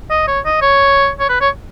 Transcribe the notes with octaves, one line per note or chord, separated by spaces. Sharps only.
D#5
C#5
D#5
C#5
C#5
B4
C#5